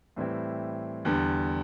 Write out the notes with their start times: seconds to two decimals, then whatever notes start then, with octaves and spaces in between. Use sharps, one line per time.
0.16 A2 E3 G3 C4 E4
1.05 E2 D3 G3